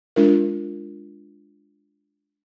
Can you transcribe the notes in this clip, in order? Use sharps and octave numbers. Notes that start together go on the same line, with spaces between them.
G#3 D4 F4 A#4